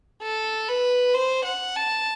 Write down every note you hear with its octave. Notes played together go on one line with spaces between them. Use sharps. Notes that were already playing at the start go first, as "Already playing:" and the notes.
A4
B4
C5
F#5
A5